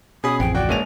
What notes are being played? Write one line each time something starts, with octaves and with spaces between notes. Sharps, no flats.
B2 C#4 G#4 B5 D#6
A1 F2 C4 G5
D2 F#4 D5 G5
G1 G#3 A#3 C#5 D#7 F7